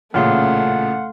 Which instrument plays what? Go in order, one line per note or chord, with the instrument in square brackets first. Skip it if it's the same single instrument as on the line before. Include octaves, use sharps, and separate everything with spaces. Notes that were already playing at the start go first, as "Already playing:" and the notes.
[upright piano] A1 A#2 C#3 [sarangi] A3 [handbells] F5 C6 F6 [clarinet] F#5